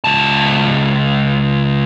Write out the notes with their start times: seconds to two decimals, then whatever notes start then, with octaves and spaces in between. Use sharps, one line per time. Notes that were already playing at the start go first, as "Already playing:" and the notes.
0.04 C#2 A5